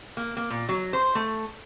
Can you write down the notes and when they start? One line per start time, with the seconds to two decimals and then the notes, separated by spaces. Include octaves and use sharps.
0.17 A#3
0.37 A#3
0.51 A#2
0.69 F#3
0.93 C5
1.15 A3